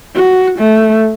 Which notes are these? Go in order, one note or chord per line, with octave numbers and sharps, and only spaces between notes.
F#4
A3